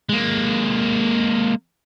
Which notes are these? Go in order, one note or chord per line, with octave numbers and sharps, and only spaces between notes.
G#3 A#3